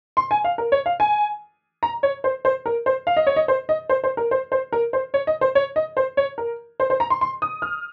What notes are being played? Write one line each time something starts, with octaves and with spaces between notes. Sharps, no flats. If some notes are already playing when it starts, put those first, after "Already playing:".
C6
G#5
F5
A#4
C#5
F5
G#5
A#5
C#5
C5
C5
A#4
C5
F5
D#5
C#5
D#5
C5
D#5
C5
C5
A#4
C5
C5
A#4
C5
C#5
D#5
C5
C#5
D#5
C5
C#5
A#4
C5
C5
A#5
C6
C6
D#6
F6